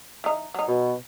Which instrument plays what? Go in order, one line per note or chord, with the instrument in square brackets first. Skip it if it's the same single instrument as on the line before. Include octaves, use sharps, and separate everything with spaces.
[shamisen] E3 D#4
F#3 D#4
[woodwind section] B2